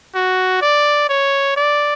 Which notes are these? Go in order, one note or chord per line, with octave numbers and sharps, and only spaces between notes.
F#4
D5
C#5
D5